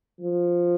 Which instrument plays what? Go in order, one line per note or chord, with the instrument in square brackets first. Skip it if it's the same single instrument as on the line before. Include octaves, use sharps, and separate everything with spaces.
[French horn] F3